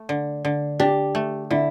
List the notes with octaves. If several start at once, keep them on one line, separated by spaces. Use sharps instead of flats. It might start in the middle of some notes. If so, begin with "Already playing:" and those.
Already playing: A3
D3
D3
D4 G4
A3
D3 E4